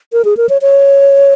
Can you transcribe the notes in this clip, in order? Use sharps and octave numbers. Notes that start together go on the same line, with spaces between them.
A#4
G#4
A#4
C#5
C#5